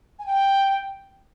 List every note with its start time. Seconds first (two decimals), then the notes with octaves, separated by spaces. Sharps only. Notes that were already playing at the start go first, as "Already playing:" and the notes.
0.19 G#5
0.26 G5